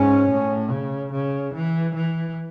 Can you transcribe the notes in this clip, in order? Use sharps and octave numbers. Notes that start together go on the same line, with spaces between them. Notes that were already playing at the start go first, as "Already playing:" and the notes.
Already playing: G#2 C#4
A2
C#3
C#3
E3
E3